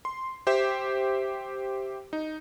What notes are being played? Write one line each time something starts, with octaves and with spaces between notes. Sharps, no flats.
C6
G4 C5 E5
D#4